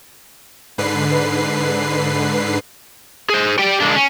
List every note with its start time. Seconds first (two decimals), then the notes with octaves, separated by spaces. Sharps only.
0.78 G#2 D3 B4 C7
3.30 G#4 C5
3.59 G4 D5 G5
3.80 D3 G#3 A#3 D4
3.95 C#4